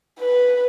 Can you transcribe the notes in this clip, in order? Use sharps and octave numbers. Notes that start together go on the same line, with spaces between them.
B4